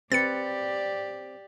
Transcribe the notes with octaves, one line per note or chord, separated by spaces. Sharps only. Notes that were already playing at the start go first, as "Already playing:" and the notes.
C4 G4 B4 D5 A6 C#7